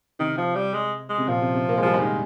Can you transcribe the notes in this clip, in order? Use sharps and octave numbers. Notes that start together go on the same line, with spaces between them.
C3 D#3
F3
G3
G#3
G#3
C3
A#2 F3
C3
C3
A#3
G#3
F3 G3
G#3
D#3